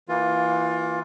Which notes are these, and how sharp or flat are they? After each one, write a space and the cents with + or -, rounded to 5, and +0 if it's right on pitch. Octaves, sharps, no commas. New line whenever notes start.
E3 +0 A#3 -5 F4 +20